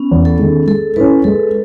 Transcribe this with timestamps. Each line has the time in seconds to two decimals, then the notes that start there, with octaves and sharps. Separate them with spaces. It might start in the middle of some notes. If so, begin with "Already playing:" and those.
Already playing: B3 C#4
0.11 E2
0.25 A4
0.39 D#3 G#3
0.67 G#3 A4
0.96 C#4 E4 B4
1.24 G#3 A4